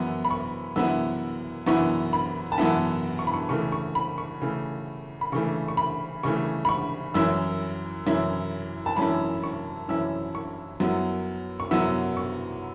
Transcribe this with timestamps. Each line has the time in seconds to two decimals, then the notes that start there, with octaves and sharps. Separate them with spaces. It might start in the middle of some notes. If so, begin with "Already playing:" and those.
Already playing: F#2 E3 B3 E4
0.25 B5
0.31 C#6
0.76 F#2 E3 B3 E4 E6
1.67 F#2 E3 B3 E4 C#6
2.13 B5
2.52 A5
2.58 F#2 E3 B3 E4 F#5
3.19 C#6
3.27 B5
3.34 C#6
3.49 C#3 E3 A3 C#6
3.72 C#6
3.95 B5
4.18 C#6
4.41 C#3 E3 A3
5.21 B5
5.32 C#3 E3 A3 C#6
5.68 C#6
5.77 B5
6.23 C#3 E3 A3 C#6
6.65 B5
6.69 C#6
7.14 F#2 E3 C#4 E4 E6
8.06 F#2 E3 C#4 E4
8.86 A5
8.97 F#2 E3 C#4 E4 B5
9.44 C#6
9.88 F#2 E3 C#4 E4 E6
10.35 C#6
10.80 F#2 F#3 B3 E4
11.60 C#6
11.71 F#2 F#3 B3 E4 E6
12.17 C#6